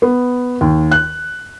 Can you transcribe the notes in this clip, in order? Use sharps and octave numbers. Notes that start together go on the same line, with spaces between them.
B3
D#2
F#6